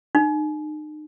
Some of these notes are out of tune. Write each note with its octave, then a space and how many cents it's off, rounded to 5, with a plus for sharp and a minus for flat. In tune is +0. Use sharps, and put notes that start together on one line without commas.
D#4 -40